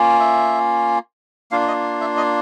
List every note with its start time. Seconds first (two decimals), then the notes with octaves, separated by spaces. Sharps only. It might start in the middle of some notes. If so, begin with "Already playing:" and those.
Already playing: A#3 C#4 F4
0.20 E5
1.52 A#3 D4 F4 F5
1.68 D#5
2.01 E5
2.17 D#5